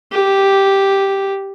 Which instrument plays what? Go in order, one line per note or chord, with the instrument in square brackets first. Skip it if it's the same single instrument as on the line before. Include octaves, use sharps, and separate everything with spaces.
[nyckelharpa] G4